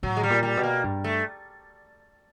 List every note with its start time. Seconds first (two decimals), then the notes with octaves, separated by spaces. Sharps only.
0.03 A2 F#3
0.17 G#3
0.23 G3
0.30 A#2
0.43 G3
0.57 B2
0.63 A#3
0.84 G2
1.04 A3